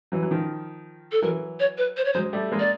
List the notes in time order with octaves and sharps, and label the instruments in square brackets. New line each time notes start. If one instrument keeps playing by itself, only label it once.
[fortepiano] E3 F#3
F#3
D#3 F3
[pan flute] A4
[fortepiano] E3 F#3 [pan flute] A#4
[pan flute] C#5
B4
C5
C#5
[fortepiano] F#3 G#3 [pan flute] C5
[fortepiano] G3 A3
G#3 A#3
[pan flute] D5